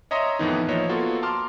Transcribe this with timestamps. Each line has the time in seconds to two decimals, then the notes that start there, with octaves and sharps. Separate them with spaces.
0.11 C#5 D#5 E5 A#5 C6 D#6
0.39 F2 A2 D#3 E3 B3 D#4
0.68 F3 A#3 C#5 D#5 E5
0.89 A#3 B3 F4 F#4 A4
1.22 A5 A#5 C6 D6 F6